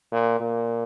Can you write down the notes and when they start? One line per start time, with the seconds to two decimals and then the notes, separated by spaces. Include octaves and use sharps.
0.12 A#2
0.40 A#2